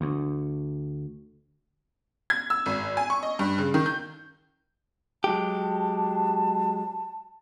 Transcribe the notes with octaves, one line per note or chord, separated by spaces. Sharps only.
D2
G#6
E6
G#1
G#5
C#6
D#5
G2
C#3
D#3
G6
F#3 G#3 G4 A5